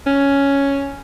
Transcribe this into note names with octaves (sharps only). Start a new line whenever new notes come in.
C#4